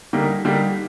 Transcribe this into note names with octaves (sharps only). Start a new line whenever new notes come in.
D3 G3 A#3 D#4
D3 G3 A#3 D#4